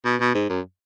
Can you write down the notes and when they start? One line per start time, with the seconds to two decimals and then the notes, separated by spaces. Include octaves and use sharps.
0.05 B2
0.20 B2
0.35 G#2
0.50 F#2